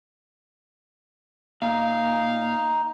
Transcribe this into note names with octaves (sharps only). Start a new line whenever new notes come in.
A#2 D#4 F5